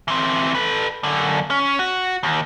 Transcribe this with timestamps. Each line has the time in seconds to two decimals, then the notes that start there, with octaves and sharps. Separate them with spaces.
0.08 E3 C4
0.55 A4 B4
1.03 F#2 D3
1.50 C#4
1.79 F#4
2.23 D#2